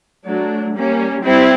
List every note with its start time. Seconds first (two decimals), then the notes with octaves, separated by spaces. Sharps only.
0.27 F#3 A3 D4
0.76 G3 A#3 C#4
1.25 G3 C4 E4